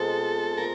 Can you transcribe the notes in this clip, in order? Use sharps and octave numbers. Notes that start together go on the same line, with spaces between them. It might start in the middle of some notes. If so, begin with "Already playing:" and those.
Already playing: B2 G#3 C4 D#4 F4 A4
A#2 F3 A#4